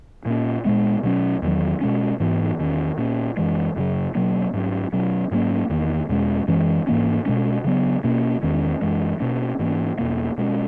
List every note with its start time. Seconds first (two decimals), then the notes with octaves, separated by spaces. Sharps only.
0.26 A#2 A#3 C#4
0.65 A#2 G#3 B3
1.03 B2 F#3 C#4
1.42 E2 D#3 F#3
1.81 B2 G#3 C#4
2.20 G#2 E3 B3
2.59 E2 D#3 A#3 C#4
2.98 A#2 A#3 C#4
3.37 F#2 E3 G#3
3.76 F#2 C#3 F#3
4.15 B2 F#3 A#3 C#4
4.53 G#2 F#3 C#4
4.93 B2 F#3 C#4
5.31 G#2 F#3 A#3 C#4
5.70 E2 D#3 A#3
6.09 E2 B2 G#3 C#4
6.48 F#2 E3 G#3 C#4
6.87 G#2 E3 A#3 C#4
7.26 B2 G#3 C#4
7.64 C#3 F#3 B3
8.04 B2 A#3 C#4
8.43 E2 D#3 G#3 C#4
8.82 F#2 E3 G#3
9.20 B2 A#3 C#4
9.59 G#2 E3 A#3 C#4
9.98 E2 B2 A#3
10.37 B2 G#3 C#4